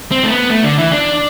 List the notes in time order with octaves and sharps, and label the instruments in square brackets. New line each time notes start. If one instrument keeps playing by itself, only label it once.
[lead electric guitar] C4
A3
B3
A3
D3
E3
D4